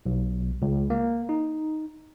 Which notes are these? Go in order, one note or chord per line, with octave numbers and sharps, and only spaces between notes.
B1
C#2
A#3
D#4